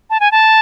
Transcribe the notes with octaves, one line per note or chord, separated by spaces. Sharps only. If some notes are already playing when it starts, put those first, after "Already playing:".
A5
G#5
A5